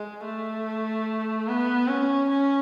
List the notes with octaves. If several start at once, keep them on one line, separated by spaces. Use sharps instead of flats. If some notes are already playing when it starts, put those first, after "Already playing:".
Already playing: G#3
A3
B3
C#4
C#4